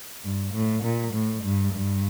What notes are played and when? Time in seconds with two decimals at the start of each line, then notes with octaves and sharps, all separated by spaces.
0.24 G2
0.53 A2
0.83 A#2
1.13 A2
1.43 G2
1.73 G2